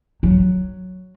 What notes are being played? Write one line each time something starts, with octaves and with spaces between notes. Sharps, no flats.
F#3